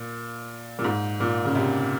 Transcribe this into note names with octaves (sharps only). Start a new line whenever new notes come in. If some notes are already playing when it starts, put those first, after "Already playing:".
Already playing: A#2
A#2
G#2
A#2
C#3
C3